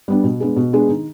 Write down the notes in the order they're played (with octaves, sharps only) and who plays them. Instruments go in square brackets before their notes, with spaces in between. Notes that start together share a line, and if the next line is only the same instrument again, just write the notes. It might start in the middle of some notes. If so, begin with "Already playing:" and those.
[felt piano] G3 B3 D4
B2
G#3 B3 D4 G#4
B2
G#3 B3 D4 G#4
D#3